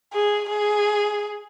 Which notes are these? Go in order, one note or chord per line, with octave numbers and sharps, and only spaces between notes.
G#4
G#4